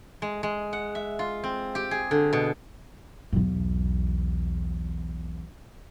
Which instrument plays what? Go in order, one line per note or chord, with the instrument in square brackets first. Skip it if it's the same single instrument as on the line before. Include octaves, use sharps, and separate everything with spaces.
[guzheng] G#3
G#3
F#5
E5
F4
C4
G4
G#4
D3
B2
[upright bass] B1 E2